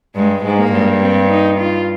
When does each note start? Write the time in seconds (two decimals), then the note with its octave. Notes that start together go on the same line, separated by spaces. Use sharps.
0.15 G2 G#3
0.44 G#2
0.58 A#3
0.72 G2
1.01 C4
1.30 D#4
1.59 F4